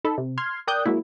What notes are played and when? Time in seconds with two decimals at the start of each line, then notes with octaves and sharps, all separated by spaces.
0.05 D#4 A4 B5
0.18 C3
0.38 C6 F6 G#6
0.67 A#4 D5 G5 D#6 F#6 G6
0.86 F#3 G#3 A#3 E4